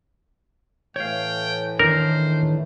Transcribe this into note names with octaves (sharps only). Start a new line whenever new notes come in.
A2 E3 A3 C#5 F5 G5
D#3 D4 A#4 C5